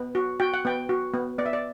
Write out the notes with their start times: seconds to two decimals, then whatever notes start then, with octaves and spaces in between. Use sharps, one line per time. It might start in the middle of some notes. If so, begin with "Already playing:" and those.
Already playing: B3
0.15 F#4
0.40 F#4 G5
0.54 F#5
0.65 B3 G5
0.89 F#4
1.14 B3
1.38 B3 D5
1.46 E5
1.53 D5